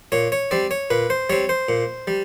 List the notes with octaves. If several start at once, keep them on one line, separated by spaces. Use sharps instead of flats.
A#2 C#5
C#5
G3 C4 D5
C#5
A#2 B4
C5
G3 C4 C#5
C5
A#2
G3